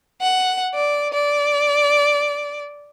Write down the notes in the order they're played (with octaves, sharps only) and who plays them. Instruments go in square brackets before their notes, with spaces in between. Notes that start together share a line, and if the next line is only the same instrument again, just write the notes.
[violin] F#5
D5
D5